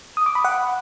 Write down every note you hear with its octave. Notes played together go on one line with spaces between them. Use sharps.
D#6
D6
B5
F#5